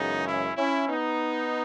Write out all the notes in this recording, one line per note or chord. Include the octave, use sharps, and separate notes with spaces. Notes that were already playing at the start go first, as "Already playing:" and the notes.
Already playing: F#2 C#3 E3 G#3 B3 D#4
C#4 E4
C#4 E4
B3 D#4